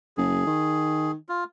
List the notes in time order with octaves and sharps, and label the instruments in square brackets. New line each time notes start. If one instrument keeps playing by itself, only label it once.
[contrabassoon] F#1 [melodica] G#4
[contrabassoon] D#3
[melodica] F4